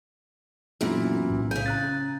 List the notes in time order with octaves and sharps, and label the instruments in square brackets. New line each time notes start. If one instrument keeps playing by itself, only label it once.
[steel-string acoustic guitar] F#2 A#2 E3 [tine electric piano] B3 D4 E4
[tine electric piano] B1 A2
[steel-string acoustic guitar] C#3 G#5 [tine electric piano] G6
[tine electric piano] A#5 F#6 A6